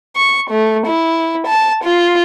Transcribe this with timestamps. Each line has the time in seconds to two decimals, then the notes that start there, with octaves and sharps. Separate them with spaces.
0.17 C#6
0.51 A3
0.87 E4
1.47 A5
1.85 F4